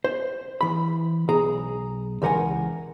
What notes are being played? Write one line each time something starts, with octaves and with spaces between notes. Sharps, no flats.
C5
E3 B5
B1 G#4 A#5
C#2 E3 A#4 F#5 G#5